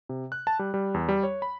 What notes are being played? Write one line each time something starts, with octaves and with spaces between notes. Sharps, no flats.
C3
F#6
A5
G3
G3
E2
G3
C#5
B5